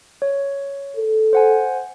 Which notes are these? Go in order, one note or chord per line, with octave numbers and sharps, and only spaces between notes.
C#5
A4
C5 F#5 G#5